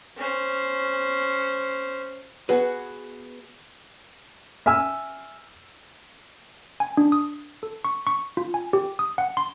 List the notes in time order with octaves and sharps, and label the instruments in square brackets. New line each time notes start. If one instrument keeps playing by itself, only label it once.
[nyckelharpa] C#4 C5
[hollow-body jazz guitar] B3 F#4 G#4 B4
[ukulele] E5 G#5 [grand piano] E6 F6
[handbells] G#5
D4
D#6
A4
C#6
C#6
F4
G#5
G4
D#6
F#5
C6